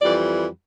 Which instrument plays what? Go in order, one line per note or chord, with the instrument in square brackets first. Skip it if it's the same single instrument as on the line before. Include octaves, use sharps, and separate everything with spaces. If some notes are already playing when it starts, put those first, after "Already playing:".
[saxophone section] F2 E3 G3 D5